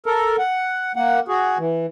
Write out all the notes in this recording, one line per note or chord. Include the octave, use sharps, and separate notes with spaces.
A4 A#4
F#5
A#3 F#5
F#4 G#4
E3